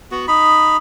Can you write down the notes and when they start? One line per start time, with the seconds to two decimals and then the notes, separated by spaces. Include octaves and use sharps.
0.11 B3 F#4
0.28 D#4 B5